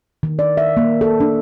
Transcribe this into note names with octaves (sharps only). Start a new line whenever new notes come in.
D#3
D5
E5
A#3
A4
D4